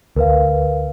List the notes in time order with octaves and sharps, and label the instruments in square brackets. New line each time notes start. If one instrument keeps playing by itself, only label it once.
[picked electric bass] D2 [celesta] A#4 B4 F5